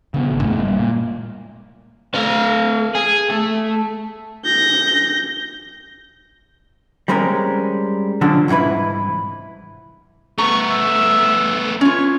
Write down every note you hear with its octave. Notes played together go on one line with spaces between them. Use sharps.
C#3 A#3 B3
G#1
A1 F#2 A2 A3
G3 G#3 A#3
A#2
A3 F5
G#4
A3
G6 A#6
G3 G#3 C4 C#4 A#4
D3 F3 F#3 C#4 D4
C2 G#2 E3 E4 B4
A3 B3 A#5 C#6
E5
C#4 F4 C#5